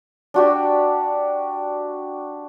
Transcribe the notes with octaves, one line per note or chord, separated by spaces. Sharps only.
D4 F#4 G4